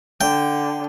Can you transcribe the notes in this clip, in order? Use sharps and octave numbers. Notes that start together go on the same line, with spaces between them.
D3 G5